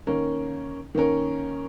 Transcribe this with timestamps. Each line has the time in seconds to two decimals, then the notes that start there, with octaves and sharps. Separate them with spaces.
0.07 D#3 A#3 C#4 A#4
0.95 D#3 A#3 C#4 A#4